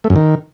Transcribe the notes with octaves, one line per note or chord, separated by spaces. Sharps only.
A3
F#2
D#3